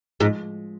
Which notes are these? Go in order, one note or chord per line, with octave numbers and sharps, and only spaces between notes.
G#2 F3 G#3